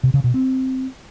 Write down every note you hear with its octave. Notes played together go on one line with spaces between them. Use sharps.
C3
C#3
B2
C4